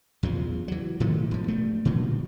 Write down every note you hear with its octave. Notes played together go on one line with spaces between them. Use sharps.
E2 C#3 F3
E3 F#3
A2 D#3 F#3 A3
E1 F3
G2 A3
A#2 D3 F3 F#3